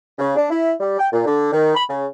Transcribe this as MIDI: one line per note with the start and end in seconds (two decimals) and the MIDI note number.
0.18 0.33 49
0.35 0.49 62
0.50 0.71 64
0.79 0.94 55
0.98 1.07 79
1.11 1.24 46
1.25 1.50 50
1.52 1.73 51
1.74 1.83 83
1.88 2.05 49